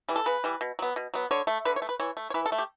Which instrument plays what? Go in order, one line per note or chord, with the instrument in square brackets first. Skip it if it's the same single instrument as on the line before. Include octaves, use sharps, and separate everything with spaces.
[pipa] E3 G3
A4
C#3 B4
E3 G3
B2
F#3 B3
B2
F#3 B3
D3 C#5
A3
D3 B4
C#5
A3
B4
E3 C#5
A3
C#5
E3 B4
A4
A3
G4